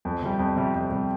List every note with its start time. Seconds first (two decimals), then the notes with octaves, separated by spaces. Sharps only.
0.05 F2
0.22 C3 G3
0.39 F2
0.56 C3 G3
0.74 F2
0.91 C3 G3